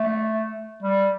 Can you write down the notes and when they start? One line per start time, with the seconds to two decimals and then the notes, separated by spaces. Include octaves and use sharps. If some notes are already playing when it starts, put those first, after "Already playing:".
Already playing: A3
0.83 G3